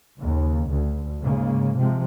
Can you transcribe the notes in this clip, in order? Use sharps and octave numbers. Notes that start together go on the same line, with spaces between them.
D#2 C#3
D2
G#2 C#3 G#3 A#3
C3 F3 G#3 C4